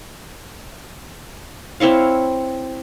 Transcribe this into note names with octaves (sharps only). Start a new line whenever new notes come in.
C4 E4 C#5 F5